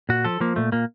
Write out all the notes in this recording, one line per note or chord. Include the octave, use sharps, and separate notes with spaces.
A#2 F#4
F3 A4
F3 A#3
A#2 A3
A#2 A#3